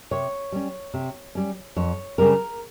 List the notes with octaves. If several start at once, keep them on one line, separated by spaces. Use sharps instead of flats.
C3 C#5
G3 C#4
C3
G3 C#4
F2 C#5
C#3 G3 C4 A#4